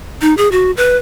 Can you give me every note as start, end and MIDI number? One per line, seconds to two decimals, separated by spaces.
0.21 0.36 63
0.37 0.51 68
0.52 0.71 66
0.77 0.97 71